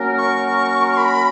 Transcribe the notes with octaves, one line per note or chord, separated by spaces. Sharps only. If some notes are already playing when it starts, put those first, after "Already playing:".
Already playing: F#3 A#3 C#4 F#4 A#4
C#6
B5